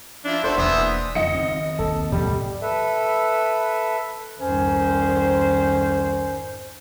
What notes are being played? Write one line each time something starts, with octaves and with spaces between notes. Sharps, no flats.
F3 D4 E4
G1 D4 E4 F#4 A4 C5
E1 E3 A#3 B3 D4 E5 D#6
F#1 F2 D#3 D#5 C#7
D#3 C4
A#1 D#2 A4
E2 G#2 B2 F3 G3
A4 B4 E5
C2 F2 G#2 D#3 C#4 C5